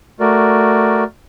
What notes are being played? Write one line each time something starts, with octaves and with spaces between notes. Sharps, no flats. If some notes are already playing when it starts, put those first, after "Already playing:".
A3 F#4 A#4 D5